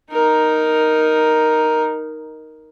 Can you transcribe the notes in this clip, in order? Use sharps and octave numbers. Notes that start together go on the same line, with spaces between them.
D#4 A#4